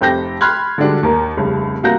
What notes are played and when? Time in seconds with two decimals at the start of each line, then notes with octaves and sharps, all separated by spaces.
0.01 F1 C4 G4 A4 G6 A#6
0.41 B5 C6 F6 F#6 G#6
0.78 D3 G3 G#3 D4 F#4
1.03 D#2 A#4
1.37 F1 C2 C#3
1.83 C2 A#3 F#4 A#4 G6 A#6